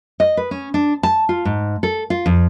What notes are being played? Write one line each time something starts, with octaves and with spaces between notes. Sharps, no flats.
D#5
B4
C#4
D4
A5
F4
G#2
A4
F4
F2